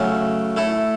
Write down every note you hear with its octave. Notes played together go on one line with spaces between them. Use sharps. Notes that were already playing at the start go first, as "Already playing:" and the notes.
Already playing: C#3 F#3 A3 C#4
A3 E4 A4